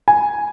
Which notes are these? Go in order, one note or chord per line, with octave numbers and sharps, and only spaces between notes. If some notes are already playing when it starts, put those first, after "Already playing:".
G#5